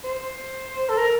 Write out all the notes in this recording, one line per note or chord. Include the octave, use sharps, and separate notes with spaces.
C5
A4
A#4